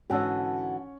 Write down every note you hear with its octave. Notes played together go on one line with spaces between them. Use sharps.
G#2 D3 E3 C#4 F#4 A4 C#5